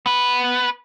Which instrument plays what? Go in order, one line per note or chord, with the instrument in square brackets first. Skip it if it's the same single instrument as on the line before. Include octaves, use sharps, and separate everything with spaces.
[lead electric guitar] B3 B4